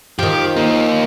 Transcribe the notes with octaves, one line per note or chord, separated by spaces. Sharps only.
D#3 F3 G4
A#3 D#4